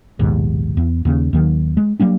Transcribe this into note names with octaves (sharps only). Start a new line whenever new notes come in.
A#1 D#2 G#2 B2
E2
D#2 C#3
D#2 D#3 F#3
G#3
F#3 G3 A#3 D4